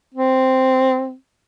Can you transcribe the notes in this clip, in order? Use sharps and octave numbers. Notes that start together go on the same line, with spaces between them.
C4